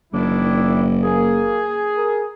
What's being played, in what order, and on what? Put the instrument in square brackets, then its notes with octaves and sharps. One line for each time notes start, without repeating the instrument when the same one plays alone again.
[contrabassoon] F#1 [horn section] D#3 D4 E4
[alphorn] A#3 [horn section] G#4
[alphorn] A#4